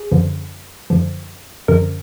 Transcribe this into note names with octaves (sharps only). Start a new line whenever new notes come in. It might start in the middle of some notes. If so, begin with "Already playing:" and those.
Already playing: G#4
F#2 D3 F3
F#2 D3 F3
F#2 D3 F3 A#4